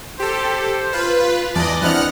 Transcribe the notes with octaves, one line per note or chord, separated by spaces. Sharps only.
G4 A4 C5
F4 B4
E2 D5 D#5 A5
E3 B3 C4 D4 F#5 F6 F#6